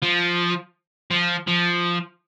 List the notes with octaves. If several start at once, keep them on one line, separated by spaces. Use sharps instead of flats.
F3
F3
F3